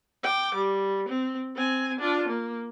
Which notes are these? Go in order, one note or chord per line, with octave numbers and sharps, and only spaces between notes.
G5 D6
G3
C4
C4 G#5
D4 F4
A#3